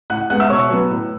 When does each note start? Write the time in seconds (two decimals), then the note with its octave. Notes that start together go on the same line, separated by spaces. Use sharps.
0.10 A2 F#5 F#6
0.30 G#3 B3 F#5 F#6
0.40 E5 E6
0.50 B2 C#5 C#6
0.70 F#3 B3
0.90 A2